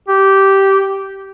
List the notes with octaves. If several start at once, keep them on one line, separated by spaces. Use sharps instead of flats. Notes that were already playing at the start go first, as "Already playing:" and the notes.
G4